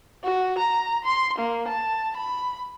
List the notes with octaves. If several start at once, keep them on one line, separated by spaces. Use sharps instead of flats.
F#4
A#5
C6
A#3
A5
B5